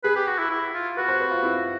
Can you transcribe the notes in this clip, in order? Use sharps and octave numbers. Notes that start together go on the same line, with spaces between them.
G#4 B4
G4
F#4
E4
E4
F4
F#4 B4
C5
B4
F4
E4